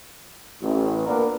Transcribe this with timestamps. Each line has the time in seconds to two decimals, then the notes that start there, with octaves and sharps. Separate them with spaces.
0.62 A1
1.07 A#2 A#3 B3 D4 A#4 B4